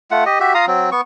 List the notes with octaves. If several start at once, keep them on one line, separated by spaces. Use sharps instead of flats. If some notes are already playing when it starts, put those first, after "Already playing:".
A3 F4 F#5
G4 D#5
F#4 G4 E5
F4 F5 A#5 D#6
F#3 C4
B3 C#6